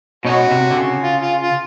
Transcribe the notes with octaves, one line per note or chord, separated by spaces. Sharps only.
B2 C#4 D#4 F#4
C3
D3
C#3
F4
F4
F4